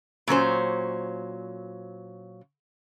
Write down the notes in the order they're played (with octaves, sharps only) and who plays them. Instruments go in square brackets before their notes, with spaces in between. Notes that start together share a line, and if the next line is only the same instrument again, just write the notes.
[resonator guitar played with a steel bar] A#2 F#3 C#4 C5